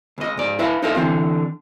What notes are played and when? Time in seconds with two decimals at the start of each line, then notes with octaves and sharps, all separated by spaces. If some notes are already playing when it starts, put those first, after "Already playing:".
0.18 C#2 D#5
0.37 G#2 D5
0.59 E4 B4 E5 F5
0.82 D#4 A4 A#4 E5 F5
0.95 D3 E3 C4 F4